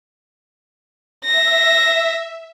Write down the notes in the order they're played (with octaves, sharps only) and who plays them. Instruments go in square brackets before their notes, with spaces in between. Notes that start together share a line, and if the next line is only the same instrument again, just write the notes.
[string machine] E5 [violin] A#6